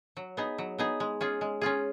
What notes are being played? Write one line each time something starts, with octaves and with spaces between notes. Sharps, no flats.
F#3
B3 D#4 G#4
F#3
B3 D#4 G#4
G#3
C#4 F4 G#4
G#3
C#4 F4 G#4